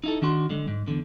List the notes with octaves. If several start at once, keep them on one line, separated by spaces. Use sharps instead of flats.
D#4 E4 A4
D#3 D4 F#4 C6
D3 G#3
G#2
E2 D3